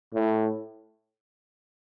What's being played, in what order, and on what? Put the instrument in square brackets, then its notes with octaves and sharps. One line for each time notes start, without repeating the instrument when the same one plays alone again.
[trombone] A2